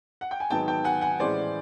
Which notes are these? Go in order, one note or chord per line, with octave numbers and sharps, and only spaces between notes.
F#5
G5
G#5
G#2 D#3 F#3 B3 D#4 G5 A5
G5 A5
F#5 G#5
F#5 G#5
A2 E3 G#3 C#4 C5 D5